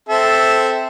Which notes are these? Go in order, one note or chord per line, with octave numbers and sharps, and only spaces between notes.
C4 A4 E5